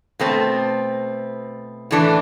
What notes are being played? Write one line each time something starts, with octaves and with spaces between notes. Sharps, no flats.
B2 A3 C4
A2 E3 A3 D4